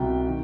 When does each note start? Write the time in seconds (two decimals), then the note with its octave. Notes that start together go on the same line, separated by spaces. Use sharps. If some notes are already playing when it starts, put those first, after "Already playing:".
Already playing: C2 B2 G5
0.29 D#3